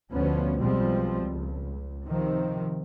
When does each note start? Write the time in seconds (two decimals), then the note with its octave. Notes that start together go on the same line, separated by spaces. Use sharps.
0.11 D2 B2 F3 B3 C#4
0.58 B1 B2 F3 G3 G#3 C4
1.24 C#2
2.05 C3 D#3 F3 C4